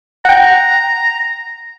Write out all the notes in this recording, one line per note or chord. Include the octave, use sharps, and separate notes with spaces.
F#5 G5 A#5